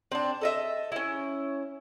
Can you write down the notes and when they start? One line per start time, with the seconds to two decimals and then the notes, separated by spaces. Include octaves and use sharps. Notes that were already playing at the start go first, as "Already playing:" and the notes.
0.12 C4 D4
0.41 A4 D#5 E5
0.92 C#4 E4